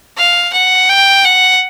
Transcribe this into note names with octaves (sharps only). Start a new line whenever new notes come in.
F5
F#5
G5
F#5